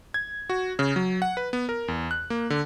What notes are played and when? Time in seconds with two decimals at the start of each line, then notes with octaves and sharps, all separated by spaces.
0.14 G#6
0.50 F#4
0.79 C#3
0.96 F#3
1.22 F#5
1.37 B4
1.53 B3
1.69 A#4
1.88 E2
2.11 F#6
2.30 A#3
2.50 D3